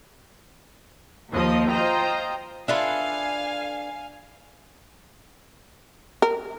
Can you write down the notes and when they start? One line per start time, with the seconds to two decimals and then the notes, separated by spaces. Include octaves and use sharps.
1.32 D#2 F3 D#5
1.68 F4 C5 D#5 G5 A#5
2.68 D4 F4 A4 B4 E5 F5 G#5
6.22 A#4